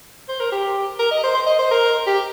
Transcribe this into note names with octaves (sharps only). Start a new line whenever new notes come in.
C5
A#4
G4
A#4
D#5
C5
C5
D#5
C5
A#4
G4